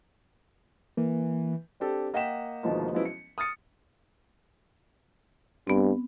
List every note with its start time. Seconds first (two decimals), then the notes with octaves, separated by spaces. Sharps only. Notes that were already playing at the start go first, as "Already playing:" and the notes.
0.97 E3 A#3
1.80 C4 D4 G4 A4
2.14 A#3 D#5 F#5 G5 B6 E7
2.63 D2 B2 D#3 F3 G#3 A#3
2.92 F3 F#3 G#3 B3 C#4 E4
3.05 C#7
3.38 D#6 F6 A6 C#7
5.67 G2 B3 C4